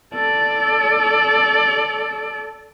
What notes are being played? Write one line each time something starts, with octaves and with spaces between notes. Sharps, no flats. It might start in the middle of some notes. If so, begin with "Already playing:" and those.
A4 D5